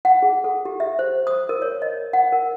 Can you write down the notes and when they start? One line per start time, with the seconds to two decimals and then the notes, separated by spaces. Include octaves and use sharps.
0.05 F#5
0.22 G#4
0.44 A4
0.65 G4
0.80 E5
0.99 C5
1.27 D#6
1.49 A#4
1.62 C#5
1.82 D#5
2.13 F#5
2.32 A#4